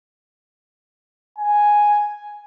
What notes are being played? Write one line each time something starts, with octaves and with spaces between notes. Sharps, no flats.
G#5